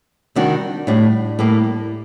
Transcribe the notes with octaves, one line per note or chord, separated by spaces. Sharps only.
C3 D#3 G3 D4 F#4
A2 G3 D4
A2 G3 A#3